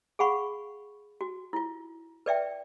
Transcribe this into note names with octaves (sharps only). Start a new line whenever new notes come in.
G#4 F5 F#5 B5 C#6
F#4
E4 F4
B4 D5 E5 G5